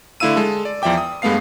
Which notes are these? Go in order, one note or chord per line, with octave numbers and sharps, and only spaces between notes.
D3 A3 E4 F5 E6 D#7
G#3 A4
D5
E2 F3 D5 E5 G5 D6
D#6
G2 G#3 A3 B3 F5 C7